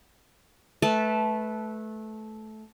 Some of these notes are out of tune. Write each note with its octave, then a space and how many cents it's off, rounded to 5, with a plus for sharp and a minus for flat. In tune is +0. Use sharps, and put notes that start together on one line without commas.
A3 -15 B4 +0 A5 -10